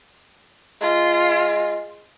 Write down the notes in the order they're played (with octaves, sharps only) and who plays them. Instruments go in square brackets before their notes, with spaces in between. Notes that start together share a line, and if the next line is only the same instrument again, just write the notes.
[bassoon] G#3 [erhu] F4